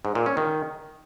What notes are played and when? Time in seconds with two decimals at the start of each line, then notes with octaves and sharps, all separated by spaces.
0.05 G#2
0.15 A#2
0.26 C#4
0.37 D#3